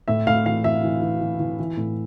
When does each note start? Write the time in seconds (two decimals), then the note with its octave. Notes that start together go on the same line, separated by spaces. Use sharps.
0.08 A2 E5
0.27 A2 F5
0.46 E3 F5
0.64 E3 E5
0.84 E3
1.02 E3
1.21 E3
1.40 E3
1.59 E3
1.77 A2